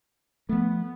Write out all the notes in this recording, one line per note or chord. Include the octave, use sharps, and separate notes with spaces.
F3 A3 B3